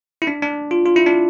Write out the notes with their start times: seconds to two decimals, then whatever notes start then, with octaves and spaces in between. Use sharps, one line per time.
0.22 E4
0.27 D4
0.42 D4
0.71 F4
0.86 F4
0.96 E4
1.07 D4